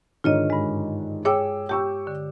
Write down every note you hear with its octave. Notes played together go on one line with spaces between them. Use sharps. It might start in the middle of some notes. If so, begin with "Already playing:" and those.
G#2 D3 D#3 F4 C#5 D#5
G2 G#3
G#4 C#5 G5 D6 E6
G4 G5 C#6 E6
D3